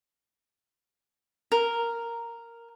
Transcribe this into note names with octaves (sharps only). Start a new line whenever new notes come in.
A#4